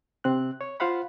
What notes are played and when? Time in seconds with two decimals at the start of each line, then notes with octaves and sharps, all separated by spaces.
0.24 C3 C4 F#6
0.61 C#5
0.80 F4 C5 F5 F#5 B5